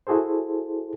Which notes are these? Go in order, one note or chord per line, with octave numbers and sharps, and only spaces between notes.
E4 F#4 G#4 A4 C5